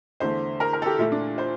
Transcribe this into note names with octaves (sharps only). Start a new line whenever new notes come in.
E2 D3 A3 C5
A#4
A#4
A4
G4
A#2 A3 E4
D4
C5